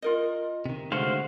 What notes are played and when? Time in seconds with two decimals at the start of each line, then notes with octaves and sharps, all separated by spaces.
0.02 F4 A#4 D#5
0.66 C3 D#3
0.92 D3 G#3 A3 F#4 C5 F5 F#5